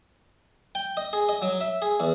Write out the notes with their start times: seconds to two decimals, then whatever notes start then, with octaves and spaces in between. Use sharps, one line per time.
0.75 G5
0.97 D#5
1.13 G#4
1.29 D#5
1.42 F#3
1.61 E5
1.82 G#4
2.00 E2